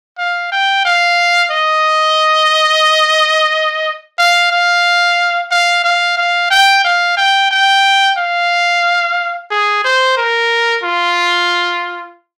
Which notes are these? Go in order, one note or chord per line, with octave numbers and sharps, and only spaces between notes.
F5
G5
F5
D#5
F5
F5
F5
F5
F5
G5
F5
G5
G5
F5
G#4
C5
A#4
F4